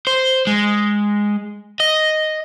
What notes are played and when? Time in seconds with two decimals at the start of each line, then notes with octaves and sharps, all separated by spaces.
0.07 C5
0.47 G#3
1.80 D#5